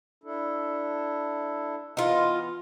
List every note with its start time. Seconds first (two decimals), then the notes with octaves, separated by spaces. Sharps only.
0.24 D4 E4 A4
1.97 E3 B3 D#4 F4